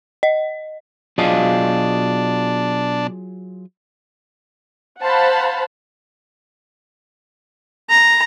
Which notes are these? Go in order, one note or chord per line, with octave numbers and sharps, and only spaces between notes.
D#5
B2 F#3 D4 F4 G#4 D#5 F5
C5 F5 F#5 A5 B5
A#5